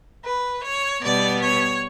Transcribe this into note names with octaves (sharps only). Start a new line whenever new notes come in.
B4
C#5
B2 G3 B3 D5
C#5